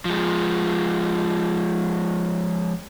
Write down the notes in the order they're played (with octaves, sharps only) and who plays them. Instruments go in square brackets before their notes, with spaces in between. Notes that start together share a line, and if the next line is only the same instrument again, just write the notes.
[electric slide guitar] F3 G#3